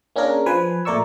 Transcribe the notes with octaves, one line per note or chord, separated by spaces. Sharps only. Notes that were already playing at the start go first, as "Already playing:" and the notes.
A#3 C#4 D4 G#4 A#4
F3 B4 G#5
A#2 A3 A#4 D5 C#6 E6